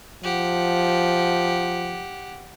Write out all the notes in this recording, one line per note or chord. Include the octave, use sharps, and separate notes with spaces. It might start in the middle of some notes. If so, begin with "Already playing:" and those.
F3 G4 F#5